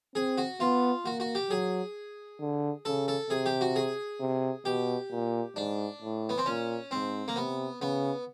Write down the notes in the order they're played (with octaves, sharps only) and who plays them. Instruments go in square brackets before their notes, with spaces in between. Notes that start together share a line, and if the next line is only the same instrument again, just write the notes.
[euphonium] C4 [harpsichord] G#4
[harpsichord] F#4
[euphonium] B3 [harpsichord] F4
[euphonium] A#3 [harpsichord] F#4
[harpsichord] F#4
G4
[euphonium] F#3 [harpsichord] G#4
[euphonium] D3
[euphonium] C#3 [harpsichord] A4
[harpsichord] A4
[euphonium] C3 [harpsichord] G#4
[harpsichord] G4
F#4
G#4
[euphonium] C3
[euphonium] B2 [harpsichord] G4
[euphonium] A#2
[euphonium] G#2 [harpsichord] D4
[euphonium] A2
[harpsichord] B3
C4
[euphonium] A#2 [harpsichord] C#4
[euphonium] G#2 [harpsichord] C4
[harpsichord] A#3
[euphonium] C3 [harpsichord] B3
[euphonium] C#3 [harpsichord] B3